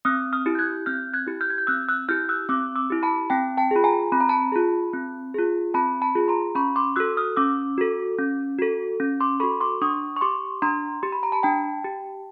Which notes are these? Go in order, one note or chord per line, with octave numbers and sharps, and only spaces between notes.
C4 D#6 F6
D#6 F6
E4 G4
G6
F#6 G#6
C4 F6 G6
F#6 G#6
E4 G4
F6 G6
G#6
G6
C4 E6 F#6
E6 F#6
E4 G4 F6 G6
E6 F#6
C4 D6 E6
D6 E6
E4 G4
A5 B5
C4 G5 A5
G5 A5
F4 G#4 B5
G#5 A#5
C4 B5
A#5
A5 B5
F4 G#4
C4
F4 G#4
C4 A5 B5
A5 B5
F4 G#4
A#5 C6
C#4 B5 C#6
C6 D6
F#4 A4 E6 F#6
D#6 F6
C#4 D6 E6
F#4 A4
C#4
F#4 A4
C#4
C6 D6
F#4 A4 B5 C#6
C6 D6
D4 C#6 D#6
C#6
G4 C6 D6
D4 A#5 C6
G4 C6
B5
A#5
A5 B5
D4 G5 A5
G4